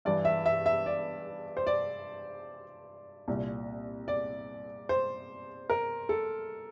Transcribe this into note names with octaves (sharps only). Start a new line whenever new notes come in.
G2 E3 D5
E5
E5
E5
D5
C5
D5
C2 A#2
D5
C5
A#4
A4